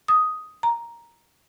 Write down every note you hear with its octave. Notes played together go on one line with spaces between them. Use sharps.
D#6
A#5